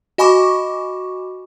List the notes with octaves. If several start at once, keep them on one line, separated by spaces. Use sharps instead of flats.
F#4 D#5 G#5 B5 C#6 D6